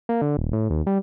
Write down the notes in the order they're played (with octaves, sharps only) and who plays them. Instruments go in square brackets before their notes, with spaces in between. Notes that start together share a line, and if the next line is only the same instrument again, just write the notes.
[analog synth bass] A#3
D3
D#1
A2
D#2
G3